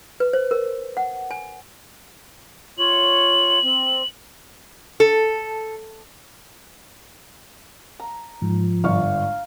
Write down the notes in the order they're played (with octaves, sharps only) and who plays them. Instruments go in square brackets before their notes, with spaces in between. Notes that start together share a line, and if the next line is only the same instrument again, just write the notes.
[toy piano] B4
C5
A#4
F#5
G#5
[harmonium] F4 C#5 [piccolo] F#7
[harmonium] C4
[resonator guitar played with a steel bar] A4
[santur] A#5
[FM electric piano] G#2 [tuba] F3
[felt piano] G1 D5 C#6 [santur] F5